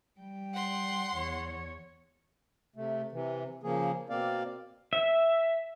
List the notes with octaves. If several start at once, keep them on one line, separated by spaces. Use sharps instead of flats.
G3 G5
F#5 C6
E2 C#5
C3 A3
C3 E3
C#3 F3 A#3 G#4
B2 A#3 C4 D5 F5
E5